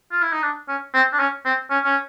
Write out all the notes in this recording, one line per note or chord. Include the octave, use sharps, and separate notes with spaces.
F4
E4
D#4
D4
C#4
C4
D4
C#4
C4
C#4
C#4